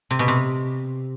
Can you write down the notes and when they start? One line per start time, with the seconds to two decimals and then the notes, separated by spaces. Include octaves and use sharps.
0.11 C3
0.19 B2
0.28 C3